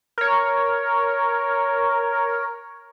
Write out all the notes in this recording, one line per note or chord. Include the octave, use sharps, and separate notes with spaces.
A#4 C#5